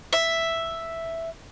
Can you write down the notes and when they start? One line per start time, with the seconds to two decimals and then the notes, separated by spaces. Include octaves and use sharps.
0.13 E5